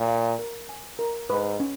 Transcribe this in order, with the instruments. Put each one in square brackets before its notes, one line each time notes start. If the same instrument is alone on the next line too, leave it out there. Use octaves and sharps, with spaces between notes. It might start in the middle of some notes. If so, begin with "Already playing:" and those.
Already playing: [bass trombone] A#2
[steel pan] F5
A#4
G#5
A#4
[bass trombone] G#2 [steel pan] B4
[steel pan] C#4